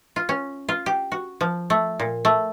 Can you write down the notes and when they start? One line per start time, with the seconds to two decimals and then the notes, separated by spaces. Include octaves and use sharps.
0.16 F4
0.29 C#4
0.69 F4
0.86 G4
1.12 F#4
1.41 F3
1.70 A3
2.00 A#2
2.25 A3